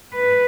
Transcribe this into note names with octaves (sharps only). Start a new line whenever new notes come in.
B4